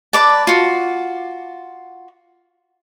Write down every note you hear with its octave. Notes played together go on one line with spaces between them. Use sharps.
B4 D5 A5
F4 F#4